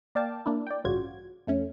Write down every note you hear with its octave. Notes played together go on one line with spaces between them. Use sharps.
A#3 D5 F5 G5 A5
A#3 D4 E4
D5 G5
A1 G2 C#3 F4 F#4 G#6
F2 A3 C#4